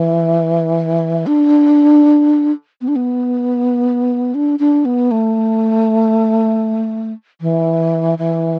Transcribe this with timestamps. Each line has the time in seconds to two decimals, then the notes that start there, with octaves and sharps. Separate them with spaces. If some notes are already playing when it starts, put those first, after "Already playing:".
Already playing: E3
1.27 D4
2.81 B3
2.88 D4
2.96 B3
4.34 D4
4.59 D4
4.85 B3
5.11 A3
7.41 E3
8.18 E3